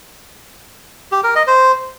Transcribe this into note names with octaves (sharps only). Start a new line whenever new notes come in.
G4
A#4
D#5
C5